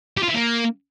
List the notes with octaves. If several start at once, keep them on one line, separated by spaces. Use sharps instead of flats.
G4
F4
E3
A#3